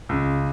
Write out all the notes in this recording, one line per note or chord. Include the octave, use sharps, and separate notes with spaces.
C#2